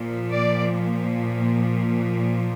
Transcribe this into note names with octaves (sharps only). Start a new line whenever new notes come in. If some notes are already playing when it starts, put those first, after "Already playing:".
Already playing: A#2 F3
D5